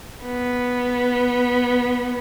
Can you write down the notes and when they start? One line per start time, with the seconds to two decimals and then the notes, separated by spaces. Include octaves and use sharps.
0.25 B3